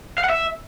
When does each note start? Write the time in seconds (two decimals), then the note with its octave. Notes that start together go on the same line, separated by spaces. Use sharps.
0.18 F5
0.24 F#5
0.30 E5